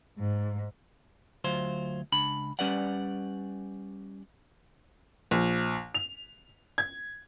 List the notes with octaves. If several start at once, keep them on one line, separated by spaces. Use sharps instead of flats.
G#2
D2 F#3 F4 C5
C#2 D4 B5
G3 C#4 G4 B4 D5 F#5
A#1
F7
G#6